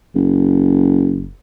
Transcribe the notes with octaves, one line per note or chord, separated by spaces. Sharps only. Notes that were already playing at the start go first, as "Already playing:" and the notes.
F#1